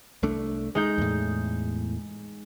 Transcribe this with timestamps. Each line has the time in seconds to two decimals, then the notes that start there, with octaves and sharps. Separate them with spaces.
0.23 C2 A3 D4
0.75 G#3 D#4 G6
0.98 E2 A2